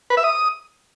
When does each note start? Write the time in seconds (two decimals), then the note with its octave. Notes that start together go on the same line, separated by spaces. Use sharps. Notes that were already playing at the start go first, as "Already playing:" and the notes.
0.10 B4
0.17 E5
0.24 D#6